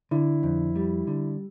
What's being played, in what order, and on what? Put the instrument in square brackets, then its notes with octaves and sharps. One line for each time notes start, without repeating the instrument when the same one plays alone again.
[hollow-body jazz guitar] D3 [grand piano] E4
[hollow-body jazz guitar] F2
G3
D3